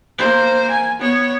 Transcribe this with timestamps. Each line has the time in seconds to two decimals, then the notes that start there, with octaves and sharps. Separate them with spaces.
0.18 A#3 C5
0.71 G#5
0.99 B3 C#5